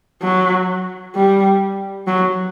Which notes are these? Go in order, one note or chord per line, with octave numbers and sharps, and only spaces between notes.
F#3
G3
F#3